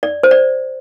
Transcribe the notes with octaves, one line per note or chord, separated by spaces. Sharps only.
D5
C5
D5